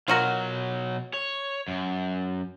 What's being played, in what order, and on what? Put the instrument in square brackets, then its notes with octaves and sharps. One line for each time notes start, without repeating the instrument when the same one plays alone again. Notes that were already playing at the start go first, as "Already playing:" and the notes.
[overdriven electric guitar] B2 F#3 [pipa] F4 F#4 A#4
[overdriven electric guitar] C#5
F#2